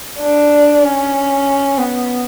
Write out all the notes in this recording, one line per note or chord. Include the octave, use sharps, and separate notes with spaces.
D4
C#4
B3